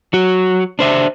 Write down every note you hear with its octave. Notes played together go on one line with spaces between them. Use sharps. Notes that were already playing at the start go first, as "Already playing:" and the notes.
F#3 F#4
D4 C5 E5